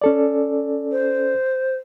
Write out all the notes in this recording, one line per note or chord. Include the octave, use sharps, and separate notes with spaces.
C#4 A4 D5
C5